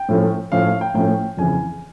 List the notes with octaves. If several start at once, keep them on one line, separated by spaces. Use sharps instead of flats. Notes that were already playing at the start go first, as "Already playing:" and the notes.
Already playing: G5
A2 F3 A3 C#4
A2 F3 A3 C#4 F5
F5
G5
A2 F3 A3 C#4 G5
F2 C#3 E3 G#5